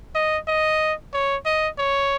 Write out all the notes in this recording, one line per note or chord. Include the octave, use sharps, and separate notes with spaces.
D#5
D#5
C#5
D#5
C#5